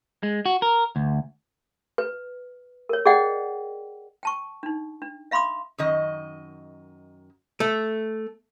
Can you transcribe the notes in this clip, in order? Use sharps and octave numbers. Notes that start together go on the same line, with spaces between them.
G#3
F#4
A#4
D2
B4
A#4 C#5
G#4 D5 D#5 F#5 G5
G5 A5 C#6
D4 D#4
D4
E5 F5 B5 C6 D6 D#6
F#2 D#3 D#5
A3